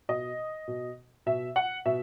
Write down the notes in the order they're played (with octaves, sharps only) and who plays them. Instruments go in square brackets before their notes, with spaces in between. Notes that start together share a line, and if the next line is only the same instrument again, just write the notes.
[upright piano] B2 D#5
B2
B2 E5
F#5
B2 E5